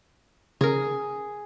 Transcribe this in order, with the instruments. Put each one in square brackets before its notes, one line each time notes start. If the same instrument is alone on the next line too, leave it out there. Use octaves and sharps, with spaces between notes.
[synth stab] C#3 A#4 [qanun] G#4